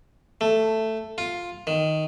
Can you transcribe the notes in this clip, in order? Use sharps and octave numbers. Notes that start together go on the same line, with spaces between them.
A3
F4
D#3